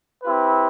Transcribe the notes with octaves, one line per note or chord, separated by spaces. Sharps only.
C4 E4 G4 B4